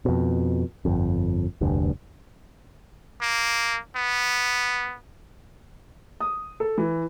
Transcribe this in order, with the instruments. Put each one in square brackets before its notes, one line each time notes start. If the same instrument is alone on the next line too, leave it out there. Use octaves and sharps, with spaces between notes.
[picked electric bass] F2 B2
G1 F2
F1 D2 G2
[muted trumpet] A#3
B3
[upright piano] D#6
A4
E3